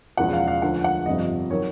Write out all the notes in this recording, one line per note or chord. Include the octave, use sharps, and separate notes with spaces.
E1 E2 C#3 F3 F#5
F5
F5
D2 D3 F3 F#5
F#5
G1 F2 C3 F3 D#5
D#3 F#3 C#5